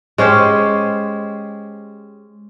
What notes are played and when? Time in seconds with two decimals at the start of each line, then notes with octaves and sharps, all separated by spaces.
0.18 G#3 C#4 G4 C5